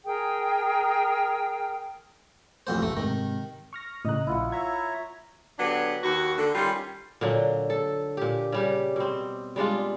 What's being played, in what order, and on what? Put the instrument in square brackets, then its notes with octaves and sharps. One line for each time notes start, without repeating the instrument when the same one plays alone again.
[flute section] G#4 A#4 G5
[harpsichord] A1 F2 C5
[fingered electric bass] F#1 B1 C#3 [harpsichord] A3
[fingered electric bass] G#2 C3 [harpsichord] D#3
[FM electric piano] C#6 F6 A#6
[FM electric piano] A2 C#3 F#6 [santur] D#5 A#5
[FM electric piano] A#1 [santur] E4 F4 F#5
[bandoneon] C#5 E5 A#5 [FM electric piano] G#6
[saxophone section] D3 F#3 B3 D4 G4
D#2 F#4
D3
D#3 G3 C#4 F4
[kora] A#2 D3 F#3
A4
A#2 G4
C#3 G3 G4
B2 C4
G3 G#3 D4 F4